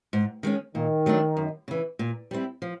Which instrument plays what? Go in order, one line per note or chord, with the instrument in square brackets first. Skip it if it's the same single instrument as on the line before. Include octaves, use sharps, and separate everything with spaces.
[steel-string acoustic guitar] G#2
D#3 G#3 C#4
[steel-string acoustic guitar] A#2 [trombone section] D#3
[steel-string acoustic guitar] F#3 A3 D4
F#2
C#3 E3
A#2
G3 C4 E4
F3